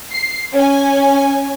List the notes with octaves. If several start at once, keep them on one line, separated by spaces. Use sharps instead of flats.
C7
C#4 G#5